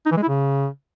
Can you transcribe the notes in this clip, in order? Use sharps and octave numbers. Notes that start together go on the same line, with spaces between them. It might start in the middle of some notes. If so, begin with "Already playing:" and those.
D#4
E3
G#3
E4
C#3